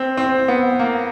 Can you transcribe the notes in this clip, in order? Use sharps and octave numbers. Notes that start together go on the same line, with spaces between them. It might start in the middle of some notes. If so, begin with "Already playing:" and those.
Already playing: C4
C4
B3
A#3